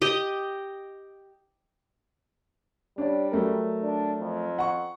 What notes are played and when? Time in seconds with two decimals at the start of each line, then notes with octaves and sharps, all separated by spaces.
0.02 G4 D#5
2.98 G3 D4 C#5 D5
3.31 F#3 A3 A#4
3.82 D4
4.20 F2
4.59 F#5 C#6